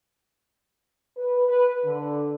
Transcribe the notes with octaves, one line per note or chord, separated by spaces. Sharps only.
B4
B4
D3